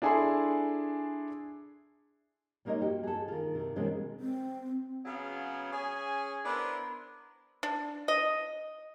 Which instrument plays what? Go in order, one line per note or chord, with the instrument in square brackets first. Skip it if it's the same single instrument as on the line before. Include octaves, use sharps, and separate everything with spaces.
[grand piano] D4 E4 G#4 A4 G#5 C6
[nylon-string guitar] G3 G#3 A#3 D#4 C#5 D#5
F#4 G4
G#4 A4
D#3 F4
C3 D#3
B2 D#3 E3 G#3 C4 C#4
[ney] C4
[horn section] C#3 F#3 B3 G#4 F5
C#4 G#4 G#5
B3 D4 E4 A#4 C5
[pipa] D4
D#5